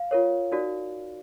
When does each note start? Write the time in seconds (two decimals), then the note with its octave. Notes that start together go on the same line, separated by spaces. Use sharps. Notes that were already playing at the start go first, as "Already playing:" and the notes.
Already playing: F5
0.11 F4 A#4 C#5
0.52 D#4 F#4 A#4 D5